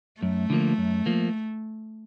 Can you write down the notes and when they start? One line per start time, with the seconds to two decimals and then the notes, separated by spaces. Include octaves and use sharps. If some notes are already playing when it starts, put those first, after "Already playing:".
0.22 F#2 A3
0.50 D3 F3 A#3
0.78 F#2
1.06 F3 A#3